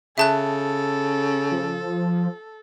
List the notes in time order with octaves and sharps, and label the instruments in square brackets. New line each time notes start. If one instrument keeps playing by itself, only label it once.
[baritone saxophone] C#3 [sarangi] A4 [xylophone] E5 A5 F#6
[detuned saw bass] F3